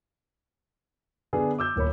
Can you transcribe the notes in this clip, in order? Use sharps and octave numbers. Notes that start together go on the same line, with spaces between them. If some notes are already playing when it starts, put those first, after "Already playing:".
D3 B3 D4 G#4
D6 E6 G6
D#1 A#3 C#5 B5